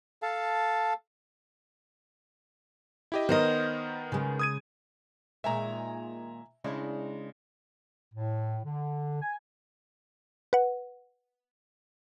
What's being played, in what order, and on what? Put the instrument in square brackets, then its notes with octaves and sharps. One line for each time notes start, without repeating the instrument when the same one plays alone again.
[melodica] A4 F5 A5
[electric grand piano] E4 G4 D#5
[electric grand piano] D#3 B3 A#4 [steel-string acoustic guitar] C5 D#5
[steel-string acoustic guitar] C#3 G#3
[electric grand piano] D#6 G#6 D#7
[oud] A#2 D#3 G#3 [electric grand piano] E5 G#5 A#5
[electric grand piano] C#3 [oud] G#3 D4 E4
[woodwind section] A2
D3
G#5
[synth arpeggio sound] B4 F#5